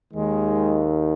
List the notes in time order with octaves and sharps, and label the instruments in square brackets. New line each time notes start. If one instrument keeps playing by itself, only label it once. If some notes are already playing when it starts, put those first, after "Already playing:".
[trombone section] D#2 D#3 G#3